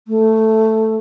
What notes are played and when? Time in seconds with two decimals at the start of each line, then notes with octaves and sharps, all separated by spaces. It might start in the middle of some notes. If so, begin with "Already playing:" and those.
0.08 A3